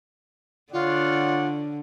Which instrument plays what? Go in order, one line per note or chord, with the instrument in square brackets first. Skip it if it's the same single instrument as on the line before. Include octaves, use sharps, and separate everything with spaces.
[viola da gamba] D3 [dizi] F4 [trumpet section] C#5 D5 F#5